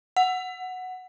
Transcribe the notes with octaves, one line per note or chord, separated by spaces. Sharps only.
F#5